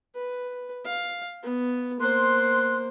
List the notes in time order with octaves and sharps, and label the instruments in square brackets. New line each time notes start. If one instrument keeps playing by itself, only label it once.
[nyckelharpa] B4
F5
B3
[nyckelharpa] A#3 C5 [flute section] C6 F#6